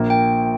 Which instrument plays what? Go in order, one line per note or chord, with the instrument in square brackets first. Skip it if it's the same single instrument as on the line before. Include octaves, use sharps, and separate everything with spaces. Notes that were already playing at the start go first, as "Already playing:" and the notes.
Already playing: [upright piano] A#1 A#3
[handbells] G5